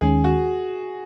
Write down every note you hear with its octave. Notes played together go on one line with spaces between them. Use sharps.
D#2 D#3 G#3 C#4 G#4
F#4